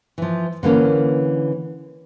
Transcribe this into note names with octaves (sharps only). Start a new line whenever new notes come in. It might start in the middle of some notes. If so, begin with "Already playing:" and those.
E3 F3
D3 E3 A#3 C#4